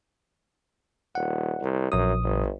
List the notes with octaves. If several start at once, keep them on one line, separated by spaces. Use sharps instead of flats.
D#1 F#5
C2
A#1 F#2 D#6
G1